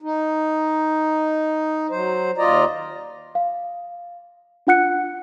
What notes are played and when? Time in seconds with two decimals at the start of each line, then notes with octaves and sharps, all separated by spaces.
0.02 D#4
1.91 F#3 C5
2.38 D#2 F4 D5 D#5 A#5
3.35 F5
4.67 D4 F4 F#5 F#6 C#7